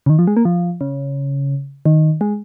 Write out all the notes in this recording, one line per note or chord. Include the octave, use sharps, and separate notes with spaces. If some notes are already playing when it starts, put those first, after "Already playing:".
C#3
D#3
F3
G#3
A#3
F3
C#3
D#3
G#3